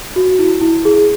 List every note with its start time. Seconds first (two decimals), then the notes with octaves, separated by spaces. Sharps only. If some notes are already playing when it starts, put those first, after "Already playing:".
0.16 F#4
0.39 E4
0.61 E4
0.85 G#4